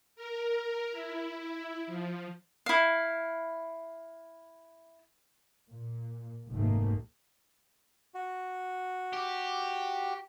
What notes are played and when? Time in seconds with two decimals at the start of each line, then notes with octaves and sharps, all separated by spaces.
0.16 A#4
0.92 E4
1.87 F3
2.66 E4 F5
5.69 A#2
6.50 F1 B1 G#2 D#3 A3 A#3
8.14 F#4
9.13 G4